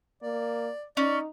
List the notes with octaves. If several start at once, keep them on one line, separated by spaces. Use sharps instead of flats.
A#3 D5
C#4 D#4 D5